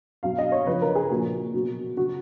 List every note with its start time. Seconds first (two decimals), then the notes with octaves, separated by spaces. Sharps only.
0.23 B2 F#3 F5
0.38 D#5
0.52 C#5
0.66 C#3 F3 B4
0.82 A#4
0.95 G#4
1.10 A#2 F3 F#4
1.54 B2 F#3
1.97 C#3 F#3 F#4